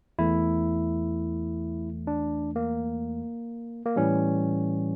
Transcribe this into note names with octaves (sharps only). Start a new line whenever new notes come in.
E2 E3 A3 E4
D4
A#3
A#3
A2 E3 G3 C#4